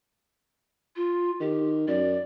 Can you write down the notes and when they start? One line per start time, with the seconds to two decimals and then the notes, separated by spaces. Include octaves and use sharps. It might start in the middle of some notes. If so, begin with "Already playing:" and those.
0.96 F4
1.40 D#3 G4
1.88 F#2 D5